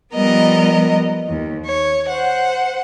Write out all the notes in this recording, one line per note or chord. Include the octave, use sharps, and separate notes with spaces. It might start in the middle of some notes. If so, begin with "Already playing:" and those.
F3 G3 B3 A#4 D#5
D#2
C#5
C5 F#5